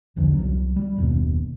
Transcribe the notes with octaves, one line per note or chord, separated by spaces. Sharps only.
B1 E2 D3 F3
C2 F#3
G3
F#1 D#2 B2